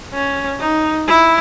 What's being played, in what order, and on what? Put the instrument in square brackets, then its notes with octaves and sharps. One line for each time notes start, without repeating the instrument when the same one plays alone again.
[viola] C#4
D#4
E4